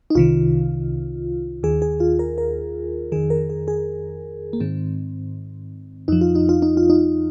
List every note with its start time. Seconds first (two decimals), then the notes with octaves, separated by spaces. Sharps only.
0.10 D#4
0.15 C2 C3 D#3 F4
1.63 D#2 D#3 G#4
1.82 G#4
2.00 F4
2.19 A#4
2.38 A#4
3.12 F2 D#3 G#4
3.30 A#4
3.50 G#4
3.68 G#4
4.53 A#3
4.60 G#2 D#3 C4
6.08 F2 F3 D#4
6.21 F4
6.35 D#4
6.49 F4
6.62 D#4
6.77 F4
6.90 D#4